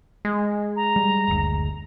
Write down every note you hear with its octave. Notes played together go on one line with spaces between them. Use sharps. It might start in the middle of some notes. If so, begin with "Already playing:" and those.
G#3
A#5
G3
F#1 D2